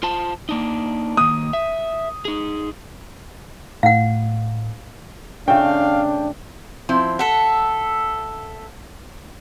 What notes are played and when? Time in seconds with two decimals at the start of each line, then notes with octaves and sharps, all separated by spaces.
0.03 F4 C5 A5
0.49 A#3 D4 D#4
1.17 D#3 A#3 D#6
1.53 E5
2.25 D#4 G#4
3.83 A2 F5 F#5
5.48 C#3 A3 D4 F5 G5
6.89 F3 C4 E4
7.19 A4 E5 F#5